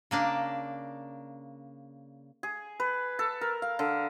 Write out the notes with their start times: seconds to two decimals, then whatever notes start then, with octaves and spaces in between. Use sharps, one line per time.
0.11 C#3 A#3 D4
2.43 G#4
2.80 B4
3.19 A4
3.41 A#4
3.62 F5
3.79 D3